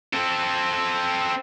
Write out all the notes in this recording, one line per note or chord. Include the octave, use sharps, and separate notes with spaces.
C4 A4